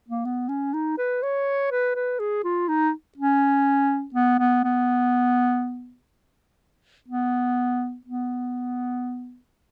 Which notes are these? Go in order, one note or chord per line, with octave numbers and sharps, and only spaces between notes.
A#3
B3
C#4
D#4
B4
C#5
B4
B4
G#4
F4
D#4
C#4
B3
B3
B3
B3
B3